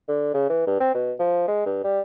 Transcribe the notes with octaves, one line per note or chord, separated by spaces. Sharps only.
D3
C#3
E3
G2
C4
B2
F3
G#3
G2
G3